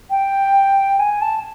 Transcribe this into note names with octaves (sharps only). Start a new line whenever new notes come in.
G5
G#5
A5